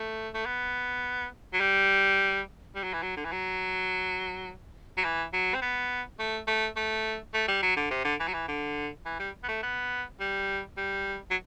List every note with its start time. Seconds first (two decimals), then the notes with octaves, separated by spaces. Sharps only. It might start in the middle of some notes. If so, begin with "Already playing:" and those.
Already playing: A3
0.34 A3
0.46 B3
1.54 F#3
1.60 G3
2.76 G3
2.84 F#3
2.93 E3
3.03 F#3
3.17 D3
3.25 E3
3.32 F#3
4.97 F#3
5.04 E3
5.33 F#3
5.55 C4
5.62 B3
6.19 A3
6.47 A3
6.76 A3
7.34 A3
7.48 G3
7.62 F#3
7.76 D3
7.90 C3
8.05 D3
8.20 E3
8.28 F#3
8.34 E3
8.48 D3
9.05 E3
9.20 G3
9.43 B3
9.48 A3
9.63 B3
10.20 G3
10.77 G3
11.31 F#3